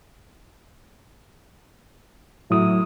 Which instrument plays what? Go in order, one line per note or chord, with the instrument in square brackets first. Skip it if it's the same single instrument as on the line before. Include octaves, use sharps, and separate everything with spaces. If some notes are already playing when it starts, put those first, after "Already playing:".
[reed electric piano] A2 F#3 D#6 [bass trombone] E4